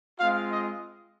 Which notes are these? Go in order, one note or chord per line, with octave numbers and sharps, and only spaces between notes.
G#3 C4 F4 F5
D#5